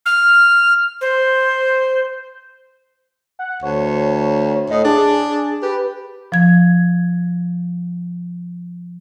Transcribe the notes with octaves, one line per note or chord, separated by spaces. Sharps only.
F6
C5
F#5
D2 C#5
A2 D#5
D4 G#4
G4 B4
F3 G#6